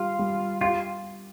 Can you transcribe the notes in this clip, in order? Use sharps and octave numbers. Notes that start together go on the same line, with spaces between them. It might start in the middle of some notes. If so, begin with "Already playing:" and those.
Already playing: G3 F4 G4
G3
F4 G4